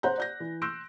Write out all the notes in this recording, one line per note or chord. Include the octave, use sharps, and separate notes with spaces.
C5 F#5 A#5 F#6 G6
D5 G6 A#6
E3
C6 E6 F#6 G6 A#6 D7